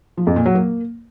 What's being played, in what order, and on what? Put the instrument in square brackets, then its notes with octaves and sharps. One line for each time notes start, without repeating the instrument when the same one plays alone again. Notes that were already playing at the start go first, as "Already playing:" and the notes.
[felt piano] F3
F2
A#2
F#3
A#3